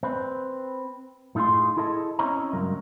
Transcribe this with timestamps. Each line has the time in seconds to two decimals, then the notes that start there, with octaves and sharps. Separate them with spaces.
0.03 C4 B4
1.35 A2 D#4 F4 G#4 C6
1.77 E4 G#4 A4 D#5 A5
2.19 C4 C#4 E4 C#5 D#5 A#5
2.53 C#2 G2 F#3 A#4